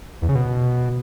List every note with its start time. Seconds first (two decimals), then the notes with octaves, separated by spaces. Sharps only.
0.22 E2
0.29 C#3
0.35 B2